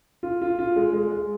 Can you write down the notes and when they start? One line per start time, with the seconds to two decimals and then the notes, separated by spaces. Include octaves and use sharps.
0.23 F4
0.42 F4
0.59 F4
0.76 G#3
0.93 G#3
1.11 G#3